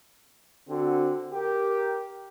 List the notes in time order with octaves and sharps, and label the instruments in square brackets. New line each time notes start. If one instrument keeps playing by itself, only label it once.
[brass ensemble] D3 C4 F#4
G4 A#4